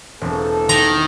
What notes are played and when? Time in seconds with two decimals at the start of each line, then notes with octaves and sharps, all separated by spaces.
0.21 E1 A#3 C4 A4
0.69 D#3 A#5